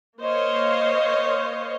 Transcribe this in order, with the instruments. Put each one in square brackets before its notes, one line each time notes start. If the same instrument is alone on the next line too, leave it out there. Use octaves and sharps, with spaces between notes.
[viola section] A#3 C5 C#5 D#5 F5